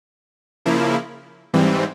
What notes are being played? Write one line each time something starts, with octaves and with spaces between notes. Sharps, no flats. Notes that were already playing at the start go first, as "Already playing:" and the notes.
C#3 F3 A#3 E4
G#2 E3 G3 C4